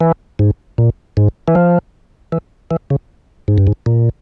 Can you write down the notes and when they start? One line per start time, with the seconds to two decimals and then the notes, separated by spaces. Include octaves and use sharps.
0.01 E3
0.39 G#2
0.78 A#2
1.17 G#2
1.48 E3
1.55 F3
2.32 E3
2.71 E3
2.90 C#3
3.48 G#2
3.58 G2
3.67 G#2
3.86 A#2